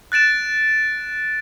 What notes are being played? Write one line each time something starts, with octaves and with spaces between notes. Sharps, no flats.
F#6 A6 D7 E7